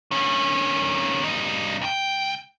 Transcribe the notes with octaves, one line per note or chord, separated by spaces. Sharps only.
D#3 C#4
G2 D#4
C#2 G5